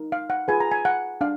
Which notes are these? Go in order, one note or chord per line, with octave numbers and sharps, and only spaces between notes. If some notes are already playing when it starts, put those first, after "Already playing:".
Already playing: D#4 A#4
F5
F#5
F4 G#4 B4 G#5
A#5
G#5
F#5
D4 F5